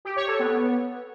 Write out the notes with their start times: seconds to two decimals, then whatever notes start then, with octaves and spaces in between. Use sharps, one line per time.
0.05 G4
0.16 C#5
0.28 A4
0.39 B3